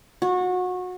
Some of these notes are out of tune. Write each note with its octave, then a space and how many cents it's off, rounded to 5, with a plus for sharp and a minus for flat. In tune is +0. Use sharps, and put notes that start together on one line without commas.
F#4 -25